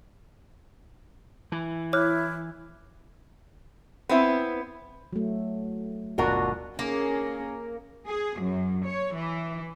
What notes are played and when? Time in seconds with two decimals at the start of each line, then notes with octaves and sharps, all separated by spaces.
1.52 E3
1.93 E4 C#5 D6 F6 F#6
4.09 B3 C4 E4
5.13 F#3 A3
6.18 G1 D#2 B2 D4 F4 F#4 A#4
6.79 A#3 C#4 G#4
8.08 G#4
8.40 F#2
8.86 C#5
9.16 E3